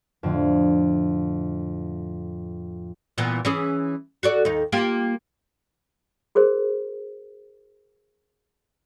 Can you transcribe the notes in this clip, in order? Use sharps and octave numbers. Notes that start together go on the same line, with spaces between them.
F2 A2 D3
A#2 E3 B3
E3 C#4 G#4
F#4 A4 D5
D#2 D#4
A#3 F4 G4
F#4 G#4 A#4 C5